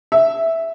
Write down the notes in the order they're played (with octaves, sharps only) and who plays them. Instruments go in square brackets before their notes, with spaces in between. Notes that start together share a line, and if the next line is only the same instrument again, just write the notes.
[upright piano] E5